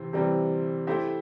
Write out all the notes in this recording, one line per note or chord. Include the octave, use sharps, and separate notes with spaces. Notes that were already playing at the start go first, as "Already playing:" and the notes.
Already playing: C3 E3 C4
C3 E3 G3 C4
A3 E4 G4 C5 E5